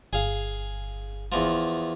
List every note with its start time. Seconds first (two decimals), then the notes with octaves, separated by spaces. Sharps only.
0.13 G1 G#4 F5
1.32 E2 F3